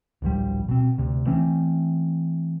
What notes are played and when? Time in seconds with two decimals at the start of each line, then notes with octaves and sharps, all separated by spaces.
0.22 D1 A#1 F3 G3
0.69 B2 C4
0.98 D2 C3
1.26 E3 A3 C4 C#4